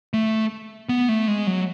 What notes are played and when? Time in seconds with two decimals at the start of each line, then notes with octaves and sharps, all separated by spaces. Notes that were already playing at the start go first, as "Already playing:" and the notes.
0.14 A3
0.89 B3
1.09 A3
1.28 G#3
1.47 F#3